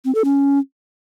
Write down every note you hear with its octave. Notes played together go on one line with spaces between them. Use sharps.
C4
A4
C#4